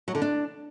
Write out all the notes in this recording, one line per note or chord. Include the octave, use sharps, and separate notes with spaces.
F#3
D3
D4